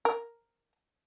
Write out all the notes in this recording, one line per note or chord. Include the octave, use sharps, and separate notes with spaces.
A#4